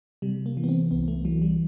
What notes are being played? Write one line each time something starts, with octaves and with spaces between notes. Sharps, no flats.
C3 G3
A#3
E3
B3
C4
C2 B3
A3
E3 F#3
G3